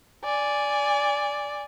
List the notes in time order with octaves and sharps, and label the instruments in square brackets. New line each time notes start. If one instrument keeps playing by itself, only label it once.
[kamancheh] D5 G#5